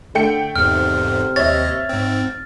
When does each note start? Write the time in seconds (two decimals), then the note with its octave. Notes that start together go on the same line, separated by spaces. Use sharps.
0.15 D3 A3 G5 C#7
0.56 E2 G#2 C3 F6
1.36 D#2 C#5 D#5 E5 A6
1.89 G#2 C4